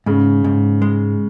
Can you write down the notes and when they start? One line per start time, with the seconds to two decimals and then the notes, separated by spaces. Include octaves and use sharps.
0.06 G#2 C#3
0.44 G#2
0.82 G#3